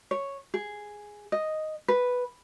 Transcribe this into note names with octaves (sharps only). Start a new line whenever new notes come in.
C#5
G#4
D#5
B4